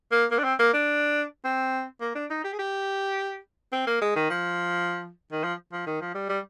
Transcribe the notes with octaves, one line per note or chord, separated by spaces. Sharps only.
A#3
A#3
D4
C4
A#3
D4
C4
A#3
D4
D#4
G4
G#4
G4
C4
A#3
G#3
D#3
F3
D#3
F3
F3
D#3
F3
G3
G3